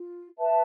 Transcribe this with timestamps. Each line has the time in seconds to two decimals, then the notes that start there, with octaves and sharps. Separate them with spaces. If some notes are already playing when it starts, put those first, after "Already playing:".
Already playing: F4
0.38 B4 E5 A5